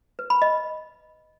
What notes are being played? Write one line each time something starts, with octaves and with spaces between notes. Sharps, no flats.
B4
B5
D#5